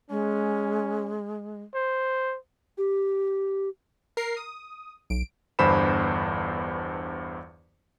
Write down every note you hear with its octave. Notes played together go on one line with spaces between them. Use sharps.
G#3 C#4
C5
G4
A#4 C7
D#6
B1 D7
G1 E2 G2 C5 B5 E7